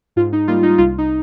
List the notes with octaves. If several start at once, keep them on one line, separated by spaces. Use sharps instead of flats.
G#2 F4
D#4
G3 A#3 F4
D#4
C2 F4
D#4